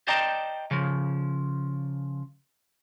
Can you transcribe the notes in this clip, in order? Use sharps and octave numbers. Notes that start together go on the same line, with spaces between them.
C5 D5 D#5 G5 A5 A#5
C#3 F3